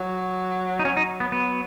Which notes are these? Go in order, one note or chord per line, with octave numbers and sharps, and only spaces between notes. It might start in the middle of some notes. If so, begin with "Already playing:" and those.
Already playing: F#3
D#4
F#3 C#4
D#4
B3
B3